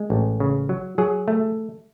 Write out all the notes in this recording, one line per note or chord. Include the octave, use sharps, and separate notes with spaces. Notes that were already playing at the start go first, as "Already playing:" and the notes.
Already playing: G#3
A1
C#3
F#3
F#3 G#4
A3